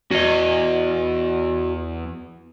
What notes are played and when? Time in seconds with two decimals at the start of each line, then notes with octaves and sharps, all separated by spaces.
0.11 E2 F#4 D#5